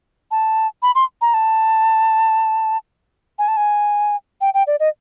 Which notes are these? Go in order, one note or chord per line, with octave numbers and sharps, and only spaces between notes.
A5
B5
C6
A#5
A5
G#5
A5
G#5
G5
G5
D5
D#5